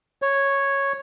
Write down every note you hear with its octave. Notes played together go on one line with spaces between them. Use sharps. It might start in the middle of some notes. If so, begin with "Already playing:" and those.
C#5